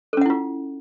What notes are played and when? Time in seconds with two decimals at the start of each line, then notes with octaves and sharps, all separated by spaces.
0.13 A4
0.17 C#4
0.21 F#5
0.26 E4
0.30 F4